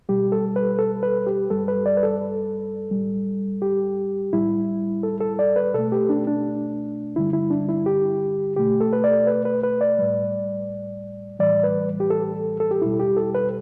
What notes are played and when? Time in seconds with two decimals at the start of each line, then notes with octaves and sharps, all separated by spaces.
0.09 B2 G3 G4
0.32 A4
0.56 B4
0.79 A4
1.03 B4
1.27 G4
1.50 G2 G3 A4
1.68 B4
1.86 D5
1.97 B4
2.03 A4
2.91 A2 G3
3.62 G4
4.33 A2 G3 E4
5.03 A4
5.21 A4
5.39 D5
5.56 B4
5.74 B2 A3 A4
5.92 G4
6.09 D4
6.27 D4
7.16 G2 D3 G3 E4
7.33 E4
7.50 D4
7.69 E4
7.86 G4
8.56 B2 A3 G4
8.81 A4
8.93 B4
9.04 D5
9.27 B4
9.45 B4
9.63 B4
9.81 D5
9.98 A2 G3
11.39 A2 E3 G3 D5
11.63 B4
12.00 G4
12.10 A4
12.60 A4
12.71 G4
12.81 E2 B2 G3 E4
12.99 G4
13.17 A4
13.35 B4